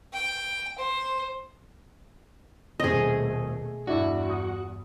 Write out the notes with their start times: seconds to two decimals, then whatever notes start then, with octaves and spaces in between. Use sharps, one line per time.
0.13 G5
0.78 C5
2.80 D#1 B2 A3 C4 G#4 D#5 D#6
3.87 E2 G2 D4 E4 F#4
4.30 D#6